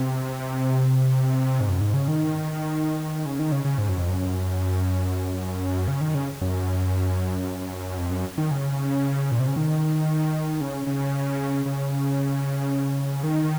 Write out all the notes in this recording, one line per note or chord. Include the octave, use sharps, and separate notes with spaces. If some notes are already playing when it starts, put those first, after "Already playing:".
Already playing: C3
G#2
F#2
G#2
C#3
D#3
C#3
D#3
C#3
C#3
G#2
F#2
F2
F#2
C#3
D#3
C#3
F#2
F2
F#2
D#3
C#3
A#2
C3
C#3
D#3
C#3
C#3
C#3
D#3